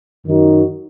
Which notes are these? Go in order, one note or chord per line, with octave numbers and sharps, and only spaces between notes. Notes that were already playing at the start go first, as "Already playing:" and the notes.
F#2 D#3 F#3 D#4 F#4